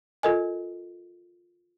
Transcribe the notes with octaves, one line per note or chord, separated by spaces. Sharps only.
F4 A4 A#4 D#5 G#5